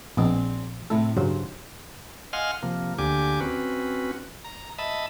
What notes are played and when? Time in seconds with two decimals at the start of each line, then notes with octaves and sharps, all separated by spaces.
0.17 A#1 B3 C4 G#4 D5 D#5
0.90 A2 C3 E4 A4
1.17 G2 C#3 F#3 C5
2.33 D#5 F5 F#5 G#5 C6 F6
2.63 C3 F3 A#3
2.98 D2 D3 A#3 G4 G#5 D6
3.40 C4 C#4 F#4 B4
4.44 A#5
4.79 D#5 E5 A5 B5